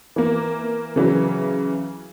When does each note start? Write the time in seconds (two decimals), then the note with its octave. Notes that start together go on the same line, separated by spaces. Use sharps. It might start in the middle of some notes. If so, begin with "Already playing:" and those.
0.16 E3 A#3
0.96 C#3 E3 F#3